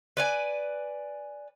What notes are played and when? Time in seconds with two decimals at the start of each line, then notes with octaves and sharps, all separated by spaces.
0.17 B4 D5 G#5